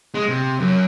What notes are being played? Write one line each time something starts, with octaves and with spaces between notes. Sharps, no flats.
G#3
C3
F#2